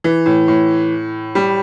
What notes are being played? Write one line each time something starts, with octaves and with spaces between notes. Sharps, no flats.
E3
A2
A2
G3